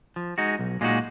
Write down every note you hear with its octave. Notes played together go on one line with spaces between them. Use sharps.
F3
G#3 D#4 F#4
B1
A#2 G#3 D#4 F#4